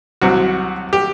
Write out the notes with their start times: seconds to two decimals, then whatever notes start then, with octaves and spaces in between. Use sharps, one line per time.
0.21 C2 C3 F#3 F#4
0.93 G4